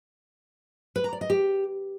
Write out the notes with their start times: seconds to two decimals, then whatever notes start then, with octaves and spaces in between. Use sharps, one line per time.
0.96 B4
1.04 A#5
1.13 D5
1.21 D#5
1.30 G4